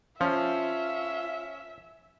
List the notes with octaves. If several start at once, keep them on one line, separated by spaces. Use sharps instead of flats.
F3 C#4 F4 E5